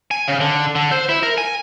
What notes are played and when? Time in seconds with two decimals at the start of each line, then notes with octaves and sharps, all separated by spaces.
0.11 G#5
0.28 C#3
0.40 D3
0.75 D3
0.92 C5
1.09 E4
1.23 A#4
1.38 G#5